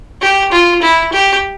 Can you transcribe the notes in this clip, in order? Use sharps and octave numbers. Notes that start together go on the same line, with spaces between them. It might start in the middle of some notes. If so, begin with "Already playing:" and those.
G4
F4
E4
G4